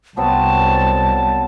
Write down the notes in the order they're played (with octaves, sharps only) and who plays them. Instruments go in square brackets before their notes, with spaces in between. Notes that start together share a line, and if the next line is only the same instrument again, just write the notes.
[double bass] C2 [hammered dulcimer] F#3 B3 C4 [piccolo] A5